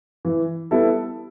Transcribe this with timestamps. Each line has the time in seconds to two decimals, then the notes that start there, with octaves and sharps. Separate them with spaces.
0.25 E3
0.71 G3 B3 E4 A4